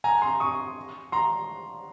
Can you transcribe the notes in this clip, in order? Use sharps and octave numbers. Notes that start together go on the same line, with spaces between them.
G#5 A#5
A#5 C6
C#6 D#6
A#5 C6